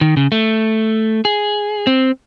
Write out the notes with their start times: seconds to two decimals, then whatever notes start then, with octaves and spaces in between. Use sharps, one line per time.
0.01 D#3
0.17 C#3
0.32 A3
1.25 G#4
1.87 C4